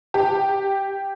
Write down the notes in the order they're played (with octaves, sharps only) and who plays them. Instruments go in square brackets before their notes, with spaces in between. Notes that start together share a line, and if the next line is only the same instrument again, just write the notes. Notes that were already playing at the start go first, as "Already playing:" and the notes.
[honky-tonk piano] G4